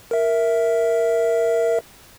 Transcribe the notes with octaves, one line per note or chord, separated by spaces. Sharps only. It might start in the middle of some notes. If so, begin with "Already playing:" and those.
A#4 E5